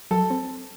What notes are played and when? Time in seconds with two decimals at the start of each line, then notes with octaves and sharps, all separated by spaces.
0.11 F#3 A4
0.30 C4